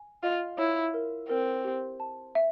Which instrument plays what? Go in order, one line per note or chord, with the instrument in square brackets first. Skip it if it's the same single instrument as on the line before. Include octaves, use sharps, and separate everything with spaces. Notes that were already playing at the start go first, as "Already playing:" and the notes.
Already playing: [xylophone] G#5
[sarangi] F4 [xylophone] D#5
[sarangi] E4 [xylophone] C#5
[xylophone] A#4
[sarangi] C4 [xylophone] A#4
[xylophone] G4
A5
E5